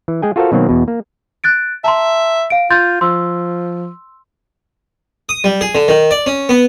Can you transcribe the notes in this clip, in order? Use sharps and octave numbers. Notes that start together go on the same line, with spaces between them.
E3
G#3 G#4 G5 G#5
F4 F#4 A4 A#4 C5 F5
B2 D#3 F#3 A#3 C4
E2 B2
A#3
F#6 A6 D7
E5 A5 A#5 C6
F5 D7
F4 C6 G6 A6
F3 C6 E6
D#6
G3
G#4
D3
D#3
D5
C#4
B3